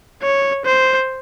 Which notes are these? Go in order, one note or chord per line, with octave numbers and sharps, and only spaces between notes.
C#5
C5